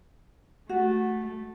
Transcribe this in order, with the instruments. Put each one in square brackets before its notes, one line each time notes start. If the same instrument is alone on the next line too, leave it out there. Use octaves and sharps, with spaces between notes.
[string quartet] A3 [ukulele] F#4